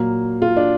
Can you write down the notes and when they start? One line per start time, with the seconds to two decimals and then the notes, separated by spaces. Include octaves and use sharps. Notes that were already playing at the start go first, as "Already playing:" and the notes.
Already playing: A#2 F#3 A#3
0.42 F4
0.57 D4